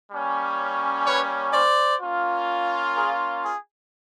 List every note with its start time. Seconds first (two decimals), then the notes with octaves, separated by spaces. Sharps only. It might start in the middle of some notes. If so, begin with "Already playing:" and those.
0.12 G3 A#3 C#4
1.07 B4 C#5
1.54 C5 D5
2.01 A#3 C#4 F4
2.95 G#4 A#4
3.43 G#4